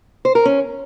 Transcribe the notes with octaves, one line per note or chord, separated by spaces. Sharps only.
C5
A#4
C#4